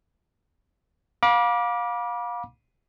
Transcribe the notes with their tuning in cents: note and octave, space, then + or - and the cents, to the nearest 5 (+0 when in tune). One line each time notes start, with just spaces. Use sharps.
F5 +30 B5 -40 D6 +0